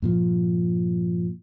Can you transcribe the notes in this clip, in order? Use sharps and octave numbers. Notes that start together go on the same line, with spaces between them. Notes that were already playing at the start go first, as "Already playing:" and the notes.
G2 A#2 F3